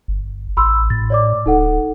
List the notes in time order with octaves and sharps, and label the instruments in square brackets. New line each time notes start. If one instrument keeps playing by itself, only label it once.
[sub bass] G1
[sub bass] A1 [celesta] B5 C6 E6
[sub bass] A2 [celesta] A6
[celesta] C#5 D5 D6
[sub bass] D1 [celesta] D#4 A4 F#5